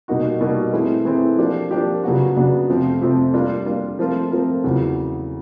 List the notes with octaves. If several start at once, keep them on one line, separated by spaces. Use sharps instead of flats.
B2 G3 A#3 D#4 F#4
B2 G3 A#3 D#4 F#4
E3 A3 C4 E4 G#4
E3 A3 C4 E4 G#4
F3 A#3 D4 G4
F3 A#3 D4 G4
C#3 F#3 B3 D4 F#4
C#3 F#3 B3 D4 F#4
F2 C3 F3 A3 C4
F2 C3 F3 A3 C4
G3 A#3 D4 F4 A#4
G3 A#3 D4 F4 A#4
F3 A3 C4 F4 A#4
F3 A3 C4 F4 A#4
E2 C#3 F#3